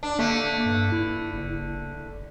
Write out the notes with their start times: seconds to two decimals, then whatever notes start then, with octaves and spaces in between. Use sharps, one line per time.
0.03 D4
0.19 D3 A3 A#3
0.66 G2
0.92 E4
1.34 F#1